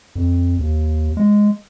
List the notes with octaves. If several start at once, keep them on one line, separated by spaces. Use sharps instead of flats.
F2
D#2
G#3